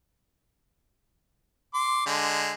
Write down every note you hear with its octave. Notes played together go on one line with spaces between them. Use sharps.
C6 D6
D3 G#3